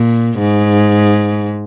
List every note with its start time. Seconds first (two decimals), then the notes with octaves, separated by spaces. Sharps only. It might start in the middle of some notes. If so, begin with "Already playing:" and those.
Already playing: A#2
0.39 G#2